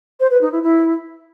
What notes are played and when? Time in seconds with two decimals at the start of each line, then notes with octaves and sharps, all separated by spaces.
0.20 C5
0.30 B4
0.41 D#4
0.52 E4
0.62 E4